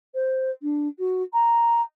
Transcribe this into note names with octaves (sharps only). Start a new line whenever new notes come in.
C5
D4
F#4
A#5